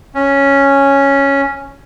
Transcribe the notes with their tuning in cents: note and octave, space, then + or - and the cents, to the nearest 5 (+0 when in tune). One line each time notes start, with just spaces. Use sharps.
C#4 +0